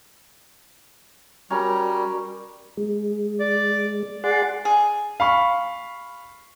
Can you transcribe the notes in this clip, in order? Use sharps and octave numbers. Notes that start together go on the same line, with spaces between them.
G3 C#4 F#4 A#4 D5 A#5
G#3
D5
G#4 D5 F#5 C6
G#4
F5 B5 C#6